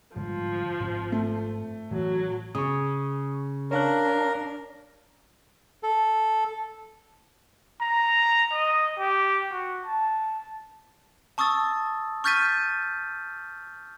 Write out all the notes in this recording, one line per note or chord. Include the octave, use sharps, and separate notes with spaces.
G#2 D3 F3 G3
G#2 C4
A3
A2 E3 F#3
C#3 C#6 D#6
D4 A#4 C#5 F5 F#6
A4
A#5
D#5
G4
F#4
A5
A5 C#6 D#6 E6 A6
C#6 F6 G6 A6 B6 D#7